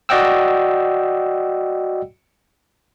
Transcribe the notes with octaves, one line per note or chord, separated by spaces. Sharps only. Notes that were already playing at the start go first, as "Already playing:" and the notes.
F#4 D5 D#5 F#5 G5 E6